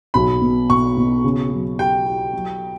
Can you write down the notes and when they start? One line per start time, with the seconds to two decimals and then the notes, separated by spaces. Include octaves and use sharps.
0.14 B1 B5
0.41 B2
0.70 B2 C#6
0.97 B2
1.24 C#3
1.51 F#3
1.78 G4 G5
2.06 G4
2.33 F#3